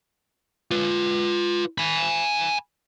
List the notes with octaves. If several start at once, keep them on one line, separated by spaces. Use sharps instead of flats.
F4 B4
G#5 B5